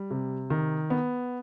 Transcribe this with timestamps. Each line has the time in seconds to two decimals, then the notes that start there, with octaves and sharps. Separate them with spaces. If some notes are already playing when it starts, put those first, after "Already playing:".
Already playing: G3
0.11 C3
0.50 D#3
0.90 B3